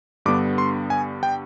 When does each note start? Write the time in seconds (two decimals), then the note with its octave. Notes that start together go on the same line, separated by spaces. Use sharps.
0.26 G2 D3 G3 B3 D6
0.58 C6
0.90 G#5
1.23 G5